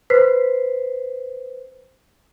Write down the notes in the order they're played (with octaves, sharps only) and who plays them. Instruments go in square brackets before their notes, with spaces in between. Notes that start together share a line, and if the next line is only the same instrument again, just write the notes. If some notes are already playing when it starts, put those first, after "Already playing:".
[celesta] B4 C5 B6 C7